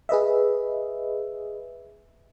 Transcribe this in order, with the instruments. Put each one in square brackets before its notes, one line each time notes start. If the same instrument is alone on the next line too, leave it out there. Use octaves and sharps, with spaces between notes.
[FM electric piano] G#4 B4 D#5 E5